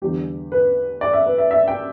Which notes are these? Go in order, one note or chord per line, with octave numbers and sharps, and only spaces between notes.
E2 D3 G3 G4
B4
D5
E5
B4
E5
E5
G5